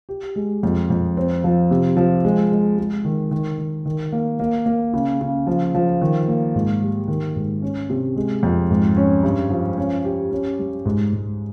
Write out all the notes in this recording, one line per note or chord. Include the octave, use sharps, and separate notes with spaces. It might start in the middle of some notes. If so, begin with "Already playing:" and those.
G4
G#3
F2
F2
C4
F3
C3
F3
G#3
G#3
G#3
D#3
D#3
D#3
D#3
A#3
A#3
A#3
C#3
C#3
F3
F3
D#3
A#3
G#2
G3
D#3
G#2
C#4
C3
G#3
F2
G#2
C#4
G2
F3
C#4
G4
C#4
G3
G#2
G#2